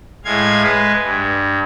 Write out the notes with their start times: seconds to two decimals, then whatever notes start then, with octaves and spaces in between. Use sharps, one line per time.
0.25 A2 G#3 F5 G#6
0.63 G#3 B4
1.02 G2